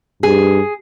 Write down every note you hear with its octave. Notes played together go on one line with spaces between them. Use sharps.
G2 G#4